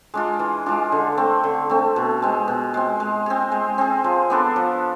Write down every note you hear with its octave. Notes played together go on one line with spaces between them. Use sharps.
G#3 D4 F4
E3
G#3 D4 F4
D3
A3 C4
D3
A3 C4
B2
G#3 C4
B2
G#3 C4
G#3
C4 G#4
G#3
C4 G#4
F3
B3 D4 A4
F3